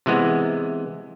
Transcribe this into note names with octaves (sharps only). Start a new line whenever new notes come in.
C3 E3 G#3 B3